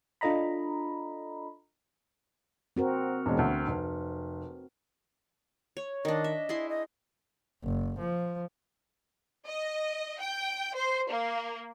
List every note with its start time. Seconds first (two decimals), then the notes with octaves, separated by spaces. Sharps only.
0.21 D4 F4 A4 D#5 A#5 B5
2.77 C4 F#4 A#4
3.26 E1 G#3
3.39 D2
3.67 F1
5.77 C#5
6.05 D#3 D4 D#5
6.24 E5
6.49 E4 G#4 C6
6.69 D#5
7.64 F#1
7.99 F3
9.47 D#5
10.21 G5
10.76 C5
11.10 A#3